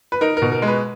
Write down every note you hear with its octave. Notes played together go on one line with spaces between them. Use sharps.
B4
D#4 A#4
B2 A#4
A#4
G#3
B4